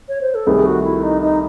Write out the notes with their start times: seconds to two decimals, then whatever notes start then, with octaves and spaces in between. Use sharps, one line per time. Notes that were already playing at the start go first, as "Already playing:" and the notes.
0.09 C#5
0.21 C5
0.35 A4
0.47 C2 C3 D#3 A3 G#4
0.66 F#4
0.84 E4
1.03 D#4
1.22 D#4